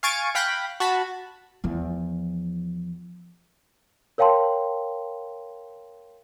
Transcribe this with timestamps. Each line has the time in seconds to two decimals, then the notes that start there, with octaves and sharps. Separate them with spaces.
0.03 F5 G#5 C#6 A6 D7 D#7
0.35 F5 G5 B5 F#6 A#6 B6
0.80 F#4 A5 B5
1.64 E2 F3
4.18 A#4 C#5 F5 G5 A5 C6